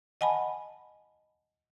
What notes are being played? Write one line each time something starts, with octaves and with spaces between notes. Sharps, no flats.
D#5 F#5 G#5 A5 B5